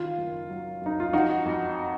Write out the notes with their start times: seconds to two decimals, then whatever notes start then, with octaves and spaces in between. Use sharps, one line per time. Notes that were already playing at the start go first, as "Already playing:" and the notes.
Already playing: D#3 F4
0.18 F#1
0.49 F#3
0.81 F#2 D#4
1.00 F4
1.13 F3 D#4 F#4
1.45 F2